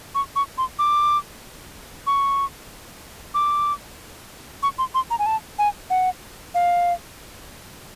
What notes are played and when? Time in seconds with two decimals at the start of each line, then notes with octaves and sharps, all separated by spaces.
0.15 C#6
0.36 C#6
0.58 C6
0.79 D6
2.07 C#6
3.34 D6
4.63 C#6
4.78 C6
4.94 C6
5.11 A#5
5.19 G#5
5.26 A5
5.59 G#5
5.90 F#5
6.55 F5